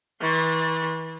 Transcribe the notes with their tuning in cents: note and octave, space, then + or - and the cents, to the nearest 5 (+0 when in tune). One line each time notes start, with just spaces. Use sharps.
E3 -30 C6 +40